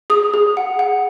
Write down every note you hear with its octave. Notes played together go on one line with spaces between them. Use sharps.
G#4 D#6
G#4
F#5
F#5